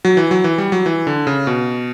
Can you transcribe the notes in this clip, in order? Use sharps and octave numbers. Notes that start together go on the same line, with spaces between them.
F#3
E3
F#3
E3
G3
F#3
E3
D3
C#3
B2